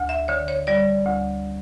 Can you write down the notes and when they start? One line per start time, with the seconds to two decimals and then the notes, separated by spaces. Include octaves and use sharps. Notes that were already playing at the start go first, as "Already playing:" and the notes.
Already playing: D2
0.09 E5
0.28 D3 C#5
0.48 C#5
0.67 G3 D5
1.05 D2